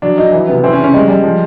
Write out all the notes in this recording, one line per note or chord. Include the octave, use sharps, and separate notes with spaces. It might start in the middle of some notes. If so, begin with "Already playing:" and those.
F#3 D4
F#3 D#4
E3
C3 B3
E3 C4
C#4
C#3
C#4
G3 G#3
G3 G#3
F3